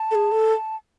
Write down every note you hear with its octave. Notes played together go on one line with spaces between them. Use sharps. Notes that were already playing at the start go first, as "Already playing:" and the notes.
Already playing: A5
A4
G#4
A4